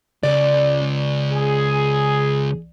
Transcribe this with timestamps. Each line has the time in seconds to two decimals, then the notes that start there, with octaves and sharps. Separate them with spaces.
0.23 C#2 D5
1.33 G#4